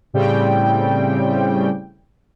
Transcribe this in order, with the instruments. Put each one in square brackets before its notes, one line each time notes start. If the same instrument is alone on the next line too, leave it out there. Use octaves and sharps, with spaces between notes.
[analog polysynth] A2 C#3 G3 C4 G5